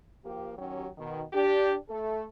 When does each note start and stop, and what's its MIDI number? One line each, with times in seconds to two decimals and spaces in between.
0.25 0.54 53
0.25 0.54 58
0.25 0.54 67
0.58 0.87 51
0.58 0.87 54
0.58 0.87 61
0.58 0.87 67
0.98 1.22 47
0.98 1.22 51
1.33 1.74 62
1.33 1.74 67
1.89 2.24 57
1.89 2.24 69